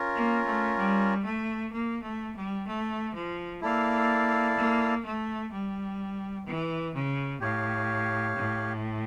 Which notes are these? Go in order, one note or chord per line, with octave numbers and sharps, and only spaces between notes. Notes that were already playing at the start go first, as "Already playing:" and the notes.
Already playing: C#4 F4 A#4
A#3
A3
G3
A3
A#3
A3
G3
A3
F3
A#3 E4 A4 D5 F5
A#3
A3
G3
E3
C#3
A2 G4 C#5 F5
A2